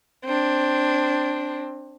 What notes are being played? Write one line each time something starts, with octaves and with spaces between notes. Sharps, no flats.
C4 D4